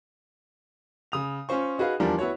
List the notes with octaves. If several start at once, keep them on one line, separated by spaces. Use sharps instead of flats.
C#3 D#6 F7
C#4 F4 C5 C#6
D#4 F#4 G#4 B4 F5
E2 F3 G3 D4 A#4
B3 E4 F#4 C#5